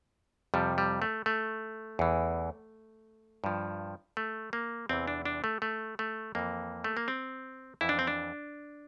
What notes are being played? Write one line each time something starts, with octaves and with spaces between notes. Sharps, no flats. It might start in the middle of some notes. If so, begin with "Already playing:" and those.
F2 C3 F3 G3
G3
A3
A3
E2 E3
G2 F3
A3
A#3
E2 C3 E3 C4
D4
D4
A3
A3
A3
F2 E3 A#3
A3
A#3
C4
F2 E3 E4
D4
C4
D4